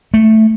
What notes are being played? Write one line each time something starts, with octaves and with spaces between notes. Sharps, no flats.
A3